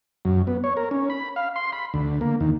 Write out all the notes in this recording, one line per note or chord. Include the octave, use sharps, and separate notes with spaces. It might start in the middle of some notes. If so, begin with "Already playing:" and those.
F#2
B3
C#5
A#4
C#4
B5
F5
C6
B5
D2
A#3
D#2